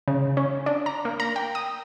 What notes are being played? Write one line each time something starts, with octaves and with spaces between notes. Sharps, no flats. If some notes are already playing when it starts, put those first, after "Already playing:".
C#3
C#4
D4
A#5
A#3
A#5
G5
D#6